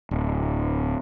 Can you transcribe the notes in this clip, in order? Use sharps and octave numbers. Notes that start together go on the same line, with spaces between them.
D1